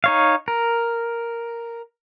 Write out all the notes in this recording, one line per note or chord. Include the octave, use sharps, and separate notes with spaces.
D#4 C#5 F5
A#4